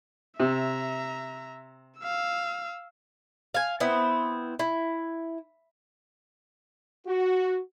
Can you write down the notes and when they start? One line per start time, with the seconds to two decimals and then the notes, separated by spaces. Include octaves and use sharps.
0.40 C3 E5 A#5
1.99 F5 E6
3.54 F5 G#5
3.80 B3 C4 E4
4.59 E4
7.07 F#4